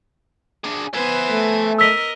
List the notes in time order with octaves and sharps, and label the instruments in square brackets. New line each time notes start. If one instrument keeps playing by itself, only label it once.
[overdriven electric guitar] D4 G#4
[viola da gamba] B3 B4 C5 [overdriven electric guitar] E5 G#5
[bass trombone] A3
[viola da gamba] A#4 D#5 [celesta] E6 B6